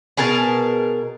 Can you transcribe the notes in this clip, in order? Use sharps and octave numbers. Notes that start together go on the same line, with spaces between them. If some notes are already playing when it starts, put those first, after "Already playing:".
B2 G#4 A#4 A5